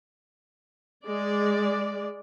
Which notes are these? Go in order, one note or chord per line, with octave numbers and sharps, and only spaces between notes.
G#3 D5